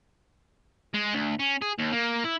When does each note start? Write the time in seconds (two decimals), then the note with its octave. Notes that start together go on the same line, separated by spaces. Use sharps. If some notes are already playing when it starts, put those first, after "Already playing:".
0.94 G#3
1.14 D2
1.40 C#4
1.62 G#4
1.79 D#2
1.92 A#3
2.24 E4